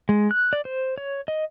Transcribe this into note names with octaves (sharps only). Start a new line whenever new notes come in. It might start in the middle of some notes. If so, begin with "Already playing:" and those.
G#3
F#6
D5
C5
C#5
D#5